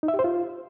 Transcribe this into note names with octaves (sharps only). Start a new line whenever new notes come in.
D#4
E5
G4
C5
F4